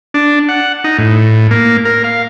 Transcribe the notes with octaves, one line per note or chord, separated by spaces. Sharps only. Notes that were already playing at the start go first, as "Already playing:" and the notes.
D4
F#5
D#4
A2
A#3
A#4
F5